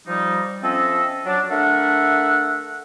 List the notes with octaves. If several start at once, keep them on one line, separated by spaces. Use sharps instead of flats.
F3 G3 D#4
F3 C4 C#4 A4 D#5 E5
F#3 D4
A3 D4 A#4 E5 F#5